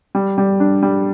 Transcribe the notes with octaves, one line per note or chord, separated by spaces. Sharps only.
G3
G3
D4
G3